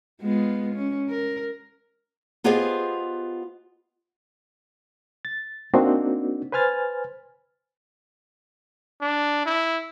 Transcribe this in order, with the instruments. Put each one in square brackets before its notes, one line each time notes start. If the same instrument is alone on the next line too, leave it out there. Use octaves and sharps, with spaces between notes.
[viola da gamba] G#3 B3 F4
C#4
A#4
[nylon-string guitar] B3 F4 G4 G#4 C5 D#5
[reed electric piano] A6
A#3 C4 D4 D#4 F#4
B4 C5 G#5 F6 A6
[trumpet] D4
E4